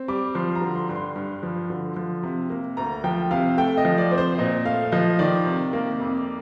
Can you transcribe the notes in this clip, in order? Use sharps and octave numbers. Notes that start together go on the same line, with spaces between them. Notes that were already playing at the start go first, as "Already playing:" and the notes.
Already playing: C4
G3 D6
F3 C6
A#5
D3
C6
G2
C6
G2
F3
D3
F3
C3
A#3
D2 A#5
F3 G5
C3 F5
A3 G5
D#5
F3
D5
C4
C5
A#2 D#5
A3 F5
F3 D#5
D#3 D5
C3
A#3
F2